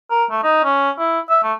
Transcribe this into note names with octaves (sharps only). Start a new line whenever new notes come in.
A#4
A3
D#4
C#4
E4
E5
A3